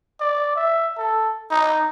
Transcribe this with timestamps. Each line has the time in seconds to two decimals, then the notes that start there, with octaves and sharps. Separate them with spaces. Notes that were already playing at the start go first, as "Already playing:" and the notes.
0.20 D5
0.56 E5
0.97 A4
1.51 D#4